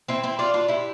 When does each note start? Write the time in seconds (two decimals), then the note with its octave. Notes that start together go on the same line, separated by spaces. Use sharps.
0.08 C4 E4
0.24 C4 E4
0.39 D4 F4
0.54 D4 F4
0.68 E4 G4